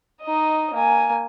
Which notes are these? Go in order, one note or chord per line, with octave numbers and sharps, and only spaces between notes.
D#4 D#5
A#3 G#5